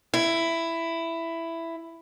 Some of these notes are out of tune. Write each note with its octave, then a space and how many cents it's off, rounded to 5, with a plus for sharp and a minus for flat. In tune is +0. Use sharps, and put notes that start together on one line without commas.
E4 +10